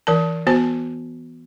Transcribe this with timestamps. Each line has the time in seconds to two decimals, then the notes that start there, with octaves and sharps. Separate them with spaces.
0.07 E3 A#4 A5
0.47 B3 F#4 C5 A5